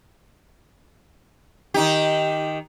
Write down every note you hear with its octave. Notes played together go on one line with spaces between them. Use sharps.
D#3 D#4 G4